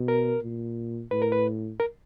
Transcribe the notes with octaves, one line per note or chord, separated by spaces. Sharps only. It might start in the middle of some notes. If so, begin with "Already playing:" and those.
Already playing: B2
A#4
A#2
A2 B4
A#4
B4
A#4